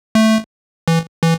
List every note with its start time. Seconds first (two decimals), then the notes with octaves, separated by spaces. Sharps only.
0.15 A3
0.88 E3
1.23 E3